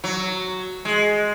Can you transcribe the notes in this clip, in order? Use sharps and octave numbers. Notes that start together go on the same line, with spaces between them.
F#3
G#3